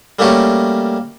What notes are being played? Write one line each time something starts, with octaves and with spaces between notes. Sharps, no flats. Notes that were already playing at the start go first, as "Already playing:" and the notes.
G3 A3 A#3 C#4 F#4 G4